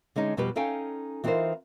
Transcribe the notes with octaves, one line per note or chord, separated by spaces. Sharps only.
D3 G#3 C#4 D#4
F2 B2 G3 F4 G4 B4
C#4 D#4 A4 F5 G5 G#5
E3 C4 D#4 F4 A#4 C5